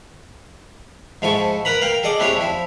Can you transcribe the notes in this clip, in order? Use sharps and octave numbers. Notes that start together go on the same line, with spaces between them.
G#2 F3 E4 A4 G#5 C#6
A#4 B4 A#5 B5
A#4 F5 G5
G#4 A4 D5 D#5 D6
C4 D4 E4 G4 G#4 C#5
F3 E4